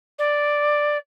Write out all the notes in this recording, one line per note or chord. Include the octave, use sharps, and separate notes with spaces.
D5